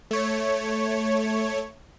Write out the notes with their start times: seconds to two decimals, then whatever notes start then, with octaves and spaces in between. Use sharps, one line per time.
0.11 A3 C#5